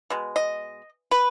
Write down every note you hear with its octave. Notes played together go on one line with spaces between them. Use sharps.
B2 G#3
D#5
B4